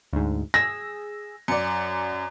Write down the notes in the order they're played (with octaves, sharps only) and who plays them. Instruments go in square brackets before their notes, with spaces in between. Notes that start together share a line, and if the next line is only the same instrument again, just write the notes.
[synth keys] D2 G#2
[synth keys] G#4 E6 [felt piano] A#6
[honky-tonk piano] F#2 D5 [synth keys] C#7